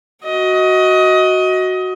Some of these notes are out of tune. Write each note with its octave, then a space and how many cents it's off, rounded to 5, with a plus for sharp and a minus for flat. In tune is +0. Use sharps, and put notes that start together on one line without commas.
F#4 +0 D#5 +20